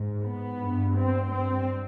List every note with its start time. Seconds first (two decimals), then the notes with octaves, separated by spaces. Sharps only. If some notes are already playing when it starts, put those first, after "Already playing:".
Already playing: G#2
0.23 B3
0.59 G2
0.97 C4
1.32 G2 C4